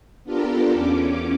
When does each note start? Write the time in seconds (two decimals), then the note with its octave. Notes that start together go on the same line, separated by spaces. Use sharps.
0.24 B3 D4 F4 G4 A4 A#4
0.72 E2 C#4 D6